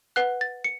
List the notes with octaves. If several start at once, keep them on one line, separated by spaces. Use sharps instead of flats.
B4 F#5 F#6
A6
C#7